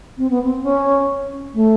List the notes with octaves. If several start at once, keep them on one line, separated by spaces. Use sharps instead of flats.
C4
B3
C4
C#4
A3